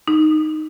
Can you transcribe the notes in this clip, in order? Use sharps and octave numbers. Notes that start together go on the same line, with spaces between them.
D#4